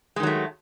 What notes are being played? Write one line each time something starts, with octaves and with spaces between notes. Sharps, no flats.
D#3 F#3 G#3 A3